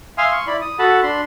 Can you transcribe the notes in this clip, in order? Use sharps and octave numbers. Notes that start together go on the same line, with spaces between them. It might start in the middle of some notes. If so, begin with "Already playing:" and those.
E5 F5 G#5 C6 D#6 F6
C6 C#6
E4 D5 B5
D#6
F#4 A4 F#5 A5 B5
D4 B5 C6